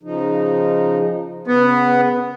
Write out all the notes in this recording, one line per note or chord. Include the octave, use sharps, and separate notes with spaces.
C#3 F3 D#4
C#3 B3